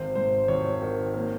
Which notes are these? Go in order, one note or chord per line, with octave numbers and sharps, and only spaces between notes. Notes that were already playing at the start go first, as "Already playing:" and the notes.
Already playing: G#1 C5
G#2 C5
G#1 C#5
D#3
A#3